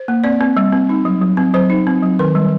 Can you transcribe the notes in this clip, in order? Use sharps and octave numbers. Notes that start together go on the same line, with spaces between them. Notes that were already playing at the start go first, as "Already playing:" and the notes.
Already playing: C5
A#3
C4 D5
C4
G3
C4
D#4
F#3
F#3
C4
F#3 C5
D#4
C4
F#3
D#3 A#4
G3